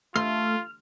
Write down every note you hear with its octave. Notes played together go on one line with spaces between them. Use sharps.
A3 F4 C6 F6